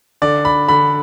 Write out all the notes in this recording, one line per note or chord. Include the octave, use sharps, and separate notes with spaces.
D3 D5
B5
D3 B5